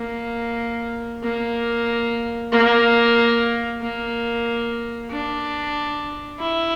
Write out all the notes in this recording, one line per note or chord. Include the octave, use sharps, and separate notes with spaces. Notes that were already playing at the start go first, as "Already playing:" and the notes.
Already playing: A#3
A#3
A#3
A#3
D4
E4